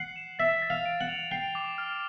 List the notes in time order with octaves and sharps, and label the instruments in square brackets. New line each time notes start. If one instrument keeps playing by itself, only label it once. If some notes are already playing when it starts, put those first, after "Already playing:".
Already playing: [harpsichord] F#5 [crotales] C7
[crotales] E7
[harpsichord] E5 [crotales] A6
[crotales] A6
[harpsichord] F5
[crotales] D7
[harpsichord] F#5
[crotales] F7
[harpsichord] G5 [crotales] C7
[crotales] D6
F6